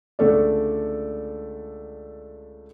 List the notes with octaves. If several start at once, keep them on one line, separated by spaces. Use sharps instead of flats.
C#2 D3 A3 A4 D5